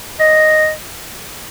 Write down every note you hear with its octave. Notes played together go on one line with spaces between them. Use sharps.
D#5